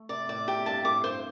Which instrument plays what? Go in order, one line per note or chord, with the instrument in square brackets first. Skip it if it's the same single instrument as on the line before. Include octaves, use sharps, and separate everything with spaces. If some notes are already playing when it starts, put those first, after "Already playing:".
Already playing: [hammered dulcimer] A3
[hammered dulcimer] C3 [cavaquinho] D5
[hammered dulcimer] A2 [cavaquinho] D5
[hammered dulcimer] C3 [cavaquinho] G4
[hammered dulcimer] G2 [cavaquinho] A5
[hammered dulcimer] A2 [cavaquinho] D6
[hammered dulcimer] G2 [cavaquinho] C5